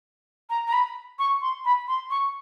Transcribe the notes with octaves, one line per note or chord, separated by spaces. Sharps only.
A#5
A#5
B5
C#6
C6
B5
C6
C#6